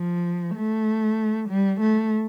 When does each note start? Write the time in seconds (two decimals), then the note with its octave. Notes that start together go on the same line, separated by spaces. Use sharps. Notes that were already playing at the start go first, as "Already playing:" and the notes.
Already playing: F3
0.55 A3
1.49 G3
1.80 A3